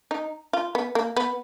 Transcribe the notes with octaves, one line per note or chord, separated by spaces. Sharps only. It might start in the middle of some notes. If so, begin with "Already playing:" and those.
D#4
F4
B3
A#3
B3